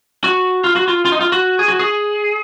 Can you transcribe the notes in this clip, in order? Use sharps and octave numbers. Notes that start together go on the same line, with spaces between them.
F#4
F4
F#4
F4
F4
D#4
F4
F#4
G#4
F#4
G#4